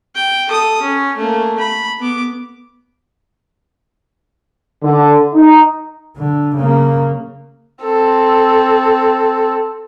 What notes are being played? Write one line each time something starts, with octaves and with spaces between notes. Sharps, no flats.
G5
A4 D#6
C#4
A3 A#3
B5
B3 D6
D3
D#4
D3
C#3 A#3
C4 A4